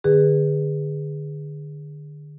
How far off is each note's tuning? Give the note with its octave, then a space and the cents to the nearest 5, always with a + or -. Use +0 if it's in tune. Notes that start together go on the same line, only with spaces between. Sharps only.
D3 +25 G#4 -20 B4 +0